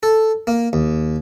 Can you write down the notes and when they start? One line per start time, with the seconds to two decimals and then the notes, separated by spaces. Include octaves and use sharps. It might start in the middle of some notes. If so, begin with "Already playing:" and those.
0.03 A4
0.47 A#3
0.73 D#2